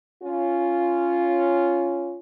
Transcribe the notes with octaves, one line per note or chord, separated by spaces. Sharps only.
C#4 F4